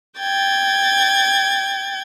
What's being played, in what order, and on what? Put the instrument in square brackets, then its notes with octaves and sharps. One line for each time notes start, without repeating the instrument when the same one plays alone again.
[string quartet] G5 G#6 A6